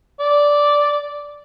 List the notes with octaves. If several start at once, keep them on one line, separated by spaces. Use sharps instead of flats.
D5